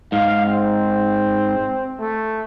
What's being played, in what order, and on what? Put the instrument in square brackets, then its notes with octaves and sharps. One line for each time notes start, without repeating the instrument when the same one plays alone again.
[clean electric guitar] G#2 [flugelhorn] F5
[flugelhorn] C4
A3